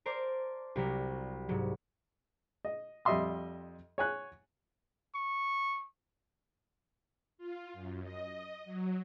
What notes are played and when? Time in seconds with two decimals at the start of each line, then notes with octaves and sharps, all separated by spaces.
0.06 A#4 C5 D5 A5 C6 D6
0.76 C2 C3 F#3 A#4 B6
1.49 G#2 C3 F#3
2.65 D#5
3.05 F2 G3 D#5 E5 C6 D#6
3.98 C#5 G#5 F#6
5.15 C#6
7.38 F4
7.73 F#2
8.03 D#5
8.65 F#3